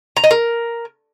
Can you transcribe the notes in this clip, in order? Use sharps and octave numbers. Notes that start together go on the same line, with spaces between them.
A#5
D#5
A#4